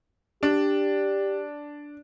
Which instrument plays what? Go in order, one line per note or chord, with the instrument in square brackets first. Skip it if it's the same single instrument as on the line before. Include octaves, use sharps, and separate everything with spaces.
[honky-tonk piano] D4 [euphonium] G4